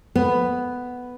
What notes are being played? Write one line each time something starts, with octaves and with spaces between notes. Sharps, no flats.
B3